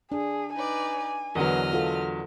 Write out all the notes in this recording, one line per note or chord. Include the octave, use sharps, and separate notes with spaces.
D4 G#4
D#4 B4 D5 G#5
E2 D3 F#3 A#4 B4 D#5 F6
F4 A4